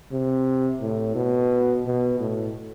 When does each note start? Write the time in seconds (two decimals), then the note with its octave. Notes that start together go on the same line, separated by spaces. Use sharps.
0.12 C3
0.81 A2
1.16 B2
1.86 B2
2.20 A2